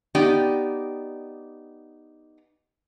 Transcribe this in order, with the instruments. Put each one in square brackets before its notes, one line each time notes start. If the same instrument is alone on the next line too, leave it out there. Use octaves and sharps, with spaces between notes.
[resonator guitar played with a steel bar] B3 D#4 G4 D5 G5